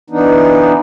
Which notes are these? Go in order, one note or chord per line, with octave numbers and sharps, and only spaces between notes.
E3 B3 D4 D#4